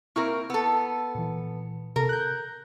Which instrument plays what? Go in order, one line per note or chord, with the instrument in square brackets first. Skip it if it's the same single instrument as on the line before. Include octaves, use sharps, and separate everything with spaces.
[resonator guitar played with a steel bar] A#3 C4 A#4 [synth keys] E4 C#6
[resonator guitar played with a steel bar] B3 A4 [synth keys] E6
[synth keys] A#2 E3
[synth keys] C3 A4 [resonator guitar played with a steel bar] A#4
[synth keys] F#6 G6